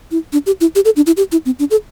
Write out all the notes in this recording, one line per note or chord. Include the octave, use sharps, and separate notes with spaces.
E4
D4
G4
E4
G4
A4
D4
E4
G4
E4
C4
D4
A4